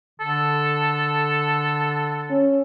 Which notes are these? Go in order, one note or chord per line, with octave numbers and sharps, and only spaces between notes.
D3 A4
C#4